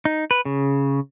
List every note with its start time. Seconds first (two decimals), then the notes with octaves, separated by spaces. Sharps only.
0.05 D#4
0.31 B4
0.45 C#3